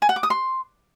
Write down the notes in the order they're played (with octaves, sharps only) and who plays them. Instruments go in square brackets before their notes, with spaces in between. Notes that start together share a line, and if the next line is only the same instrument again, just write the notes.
[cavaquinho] G#5
F#5
D6
D#6
C6